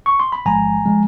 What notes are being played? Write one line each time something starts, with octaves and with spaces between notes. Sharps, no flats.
C#6
C6
B5
A1 G#2 F3 G#3 G#5 A#5
F3 G#3